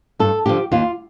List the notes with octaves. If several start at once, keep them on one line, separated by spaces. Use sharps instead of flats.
G2 A4
D3 F3 G4
D#2 F4